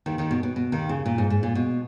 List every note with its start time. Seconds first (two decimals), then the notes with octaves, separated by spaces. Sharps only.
0.06 D#2 D#3
0.18 D#2 D#3
0.31 B2
0.43 B2
0.56 B2
0.72 D#2 D#3
0.89 C#3
1.06 A#2
1.18 G#2
1.30 G#2
1.43 A#2
1.55 B2